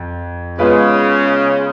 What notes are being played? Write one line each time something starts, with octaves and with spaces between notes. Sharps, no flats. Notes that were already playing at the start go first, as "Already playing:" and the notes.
Already playing: F2
C#3 G#3 B3 F4 B4